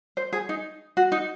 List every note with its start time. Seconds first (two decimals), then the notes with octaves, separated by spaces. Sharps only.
0.17 C5
0.33 G#4
0.49 D#4
0.97 F#4
1.12 D#4